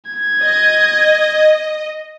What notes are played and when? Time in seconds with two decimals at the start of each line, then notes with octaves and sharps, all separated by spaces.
0.11 G#6
0.43 D#5